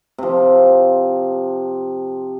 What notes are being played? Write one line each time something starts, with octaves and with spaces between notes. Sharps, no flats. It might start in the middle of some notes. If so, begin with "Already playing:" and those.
C3 F3